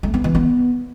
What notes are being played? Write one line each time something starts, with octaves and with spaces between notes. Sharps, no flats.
A3
B3
E3
B3